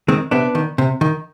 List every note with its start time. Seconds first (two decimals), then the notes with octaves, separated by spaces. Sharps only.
0.08 D#3 G#3 C4
0.31 C3 B3 D4
0.55 D#3
0.78 C3
1.01 D#3